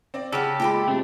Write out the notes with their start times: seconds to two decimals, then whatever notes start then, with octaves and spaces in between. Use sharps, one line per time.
0.14 C4 D5
0.33 C#3 C#4 G4 A4 F#5
0.60 A#2 G#3 G5 A#5 B5
0.88 C3 A3 D4